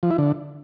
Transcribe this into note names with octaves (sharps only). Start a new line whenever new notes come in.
F3
E4
D3